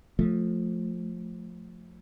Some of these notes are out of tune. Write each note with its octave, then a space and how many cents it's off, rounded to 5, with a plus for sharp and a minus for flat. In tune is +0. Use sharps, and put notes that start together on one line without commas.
F3 +15 A3 +0